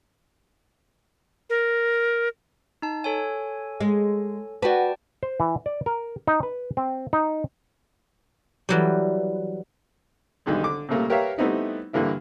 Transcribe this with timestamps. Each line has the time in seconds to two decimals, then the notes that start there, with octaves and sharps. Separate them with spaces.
1.50 A#4
2.82 D#4 A5
3.04 A4 C#5 G#5
3.80 G#3
4.62 F#4 B4 D5 G5 A5
5.23 C5
5.40 E3
5.66 D5
5.86 A#4
6.27 D#4
6.43 B4
6.77 C4
7.13 D#4
8.69 E3 F#3 G3
10.46 B1 D3 D#3 G3 G#3
10.63 D3 D6
10.89 A#2 C#3 G3 A3 A#3
11.10 G4 A#4 B4 C#5 E5 F5
11.38 G3 A3 B3 C4 D#4 E4
11.93 G2 D3 E3 A#3 E4